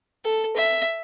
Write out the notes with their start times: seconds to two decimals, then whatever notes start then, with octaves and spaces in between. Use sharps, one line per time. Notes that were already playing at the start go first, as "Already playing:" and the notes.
0.24 A4
0.56 E5